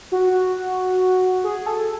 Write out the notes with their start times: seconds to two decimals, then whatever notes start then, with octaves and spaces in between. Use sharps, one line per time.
0.12 F#4
1.44 G#4
1.66 A4